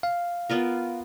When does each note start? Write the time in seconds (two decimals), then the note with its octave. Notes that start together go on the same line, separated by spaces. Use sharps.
0.03 F5
0.49 B3 F4 A#4